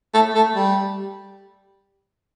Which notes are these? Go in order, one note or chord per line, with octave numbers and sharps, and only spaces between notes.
A3
A3
G3